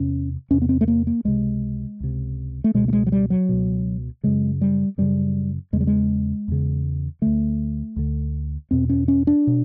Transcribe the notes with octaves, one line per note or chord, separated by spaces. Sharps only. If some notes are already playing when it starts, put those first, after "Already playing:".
Already playing: E2 C3 C#4
E2 C3 C#4
B3
C4
A3
A#3
A#3
C#2 C3 G#3
C#2 C3
A3
C#2 B2 G#3
A3
G#3
F#3
G3
F#3
C#2 B2
F#2 C#3 G#3
G3
F#2 C#3 G3
E2 C#3 G#3
G3
G#3
E2 C#3
D2 D3 A3
D2 D3
E2 B2 C4
C#4
C#4
D4
B2